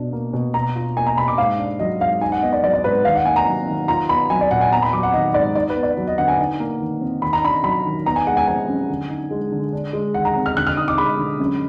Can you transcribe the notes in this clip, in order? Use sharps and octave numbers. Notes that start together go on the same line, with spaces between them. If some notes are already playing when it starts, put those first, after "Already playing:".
Already playing: B2 D4
A#3
B2
B2 A#5
F4
A#3 G#5
A#5
B2 B5
D6
G#2 F5
D4
F#3 D#5
G#2 F5
D#4 G#5
F#5
B3 D#5
D5
F#3 D5
D5
G#2 B4
D#3 F5
F#5
A#3 G#5
A#5
F#3
D#3
F4 A#5
B3 B5
F#3 G#5
D5
A#2 F#5
G#5
B3 A#5
B5
F#3 D6
F#5
D#3 D#5
G#2 D5
D#4 D5
B4
B3
D5
F#3
D#5
D3 F#5
G#5
D#4
A#3
D#3
F2
D#3 B5
A#5
D4 B5
F#3 B5
D#3
B3 A#5
G#5
G#3 F#5
G#5
F3 G#5
F#2
D3
D#4
G#3
D3
D4
G#3
D#3 F#5
A#5
F2
F6
D3 F#6
F6
D#4 D#6
D6
G#3 B5
D3
F#2